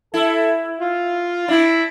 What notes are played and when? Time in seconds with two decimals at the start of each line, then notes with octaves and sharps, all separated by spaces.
0.14 E4 A4
0.80 F4
1.48 D4 E4